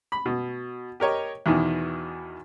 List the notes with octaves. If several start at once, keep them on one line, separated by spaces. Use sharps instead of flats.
B5
B2
G4 A#4 C#5 D#5
E2 B2 D#3 E3